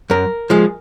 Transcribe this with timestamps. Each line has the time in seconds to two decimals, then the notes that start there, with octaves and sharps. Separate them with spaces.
0.10 F#2 A#4
0.50 F3 G#3